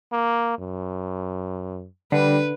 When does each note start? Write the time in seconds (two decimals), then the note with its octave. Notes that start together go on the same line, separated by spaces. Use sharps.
0.12 A#3
0.59 F#2
2.12 D3 G3 B4